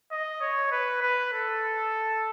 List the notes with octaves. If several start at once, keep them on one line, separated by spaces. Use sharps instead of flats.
D#5
C#5
B4
B4
A4